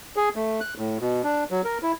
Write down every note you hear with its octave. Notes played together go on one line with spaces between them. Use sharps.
G#4
A3
F#6
A2
B2
D4
F#3
A#4
E4